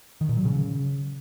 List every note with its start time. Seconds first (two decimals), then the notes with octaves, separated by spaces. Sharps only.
0.21 D#3
0.29 A#2
0.37 F#3
0.45 C#3